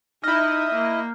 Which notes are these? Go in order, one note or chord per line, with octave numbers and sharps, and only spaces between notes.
D#4 E4 D#5 F6 G6
A#3